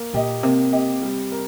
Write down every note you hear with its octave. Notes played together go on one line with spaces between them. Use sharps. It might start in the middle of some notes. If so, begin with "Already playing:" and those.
Already playing: A#3
A#2 G4 D#5
C3 A#3
G4 D#5
G3
A#4